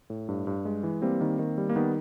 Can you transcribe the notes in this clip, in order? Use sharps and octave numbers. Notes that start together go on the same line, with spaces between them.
A2
G2
G2
G#3
E3
G3 A#3 C4
D#3
D#3
G3
A#3
D#3 B3